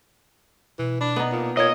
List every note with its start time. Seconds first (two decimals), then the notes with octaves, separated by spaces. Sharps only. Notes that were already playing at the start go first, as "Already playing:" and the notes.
0.79 B2 E3
1.01 D4 B5
1.16 B3 D#4
1.32 A#2
1.57 A#2 C#5 D#5 G#6